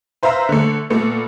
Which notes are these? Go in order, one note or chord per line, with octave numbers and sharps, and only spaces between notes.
B4 C5 E5 F5 A#5
D3 A3
A#2 A3 B3